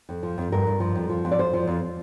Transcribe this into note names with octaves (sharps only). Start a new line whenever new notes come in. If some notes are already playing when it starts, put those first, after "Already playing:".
F2
F3
F2
G2 A#4
G2
F3
F2
F3
F2
D5
F2 C5
F3
F2